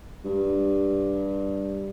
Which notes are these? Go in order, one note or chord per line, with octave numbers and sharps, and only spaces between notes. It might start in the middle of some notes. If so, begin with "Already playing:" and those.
G2